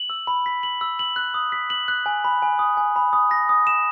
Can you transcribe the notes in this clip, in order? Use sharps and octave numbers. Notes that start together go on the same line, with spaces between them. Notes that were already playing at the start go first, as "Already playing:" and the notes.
Already playing: F#7
E6
B5
B6
F#7
E6
F#7
F#6
D#6
B6
F#7
F#6
G#5
B5
G#5
D#6
G#5
B5
D#6
A#6
D#6
E7